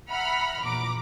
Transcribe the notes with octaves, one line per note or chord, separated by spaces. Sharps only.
E5 F#5 A#5 B5 F6
A#1 E2 A#5 D6